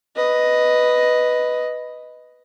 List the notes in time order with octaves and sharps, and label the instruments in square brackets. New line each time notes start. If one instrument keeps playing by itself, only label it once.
[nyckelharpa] B4 D#5